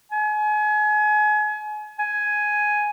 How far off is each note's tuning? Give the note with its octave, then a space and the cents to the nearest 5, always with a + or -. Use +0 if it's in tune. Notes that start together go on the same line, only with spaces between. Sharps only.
G#5 +30
G#5 +5